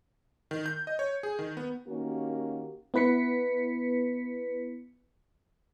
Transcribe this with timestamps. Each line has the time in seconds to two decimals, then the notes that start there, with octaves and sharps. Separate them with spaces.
0.51 D#3
0.66 G6
0.87 D#5
0.99 C#5
1.23 G#4
1.39 D#3
1.57 B3
1.88 D#3 A#3 C#4 F#4 G4
2.94 B3 E4 B4 B6 C#7